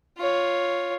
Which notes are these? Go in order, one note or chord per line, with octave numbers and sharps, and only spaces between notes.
F4 C#5